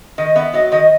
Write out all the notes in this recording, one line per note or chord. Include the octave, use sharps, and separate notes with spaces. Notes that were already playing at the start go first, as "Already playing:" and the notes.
D#3 D#5
B3 E5
F#3 D#5
D#3 D#5